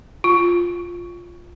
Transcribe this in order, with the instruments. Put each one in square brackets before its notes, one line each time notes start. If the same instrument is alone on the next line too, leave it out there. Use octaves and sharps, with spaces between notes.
[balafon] F4